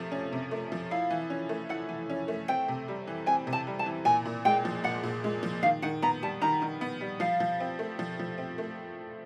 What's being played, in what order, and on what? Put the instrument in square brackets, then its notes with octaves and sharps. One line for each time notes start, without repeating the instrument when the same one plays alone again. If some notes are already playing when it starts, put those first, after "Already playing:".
Already playing: [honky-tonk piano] C3 F3 A3
C#4
C3
A3
F3
[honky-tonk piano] E4 [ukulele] F5
[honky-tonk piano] E3
C#4
A3
[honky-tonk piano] E4 [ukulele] F#5
[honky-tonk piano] E3
C#4
A3
[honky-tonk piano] C4 [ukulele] G5
[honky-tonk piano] C3
G3
E3
[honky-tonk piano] C4 [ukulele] G#5
[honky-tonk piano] C3
[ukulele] A5
[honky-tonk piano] G3
[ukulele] A5
[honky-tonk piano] E3
[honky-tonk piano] A#2 [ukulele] G#5
[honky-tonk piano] A#2
[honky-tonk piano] G#3 [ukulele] G5
[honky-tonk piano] F3
[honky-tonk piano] A#2 [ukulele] F#5
[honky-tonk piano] A#2
G#3
F3
[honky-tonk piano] D#3 [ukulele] F5
[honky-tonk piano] D#3 [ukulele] F#5
[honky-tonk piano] B3 [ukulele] A#5
[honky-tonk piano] G3 [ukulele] A5
[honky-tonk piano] D#3 [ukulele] A#5
[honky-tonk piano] D#3
B3
G3
[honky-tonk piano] F3 [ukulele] F5
[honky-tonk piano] F3
C4
A3
F3
F3
C4
A3